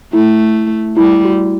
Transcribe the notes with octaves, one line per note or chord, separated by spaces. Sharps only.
A3 E4
G3 E4
F#4